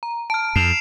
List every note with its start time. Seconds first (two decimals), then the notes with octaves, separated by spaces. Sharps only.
0.03 A#5
0.30 A5 F6 D7
0.56 F2 C7 E7 F7